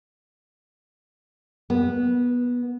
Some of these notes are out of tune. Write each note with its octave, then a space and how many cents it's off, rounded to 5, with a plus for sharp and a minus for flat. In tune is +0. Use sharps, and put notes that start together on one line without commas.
B3 -15